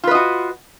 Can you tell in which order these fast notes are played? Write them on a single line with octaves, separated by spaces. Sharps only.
F4 B4 D#5 F#4